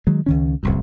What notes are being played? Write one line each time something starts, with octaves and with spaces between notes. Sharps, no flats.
D#3 F#3 G#3
C#2 D#3 C#4
D1 C2 F#2